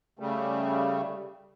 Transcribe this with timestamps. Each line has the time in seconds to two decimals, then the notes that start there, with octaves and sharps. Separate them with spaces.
0.19 C#3 G3 A3